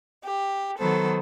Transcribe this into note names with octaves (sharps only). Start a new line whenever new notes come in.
G4
D#3 F#3 B3 A4 C5